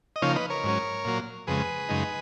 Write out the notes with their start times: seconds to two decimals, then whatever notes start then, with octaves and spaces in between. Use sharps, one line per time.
0.16 D#5
0.22 C#3 F3 A#3 D#4 C#5 F5
0.36 B4 D#5
0.50 A#4 C#5
0.64 G#2 F#3 C#4
1.05 A#2 F#3 A#3
1.47 F2 C#3 G#3 G#4 B4
1.89 F#2 C#3 G#3 D#4